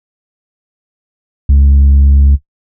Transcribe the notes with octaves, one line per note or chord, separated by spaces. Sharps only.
C#2